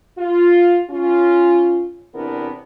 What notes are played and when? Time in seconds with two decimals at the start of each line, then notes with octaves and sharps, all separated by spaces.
0.19 F4
0.91 C#4 F4
2.14 E2 C3 B3 D4 E4 A#4